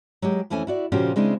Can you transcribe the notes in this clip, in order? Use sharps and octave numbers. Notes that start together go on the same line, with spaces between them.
F#3 G#3 G4
F2 E3 A3 C#4 G#5
E4 F#4 D5
A#2 C#3 F3 C#4 F#4 G4
C#3 G#3 C4 D4 E4